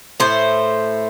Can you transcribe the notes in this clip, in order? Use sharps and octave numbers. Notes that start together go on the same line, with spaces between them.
A2 A3 C5